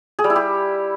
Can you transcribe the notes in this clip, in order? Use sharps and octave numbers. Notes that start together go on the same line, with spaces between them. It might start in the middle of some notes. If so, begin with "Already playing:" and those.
G#4
G3
E4
G4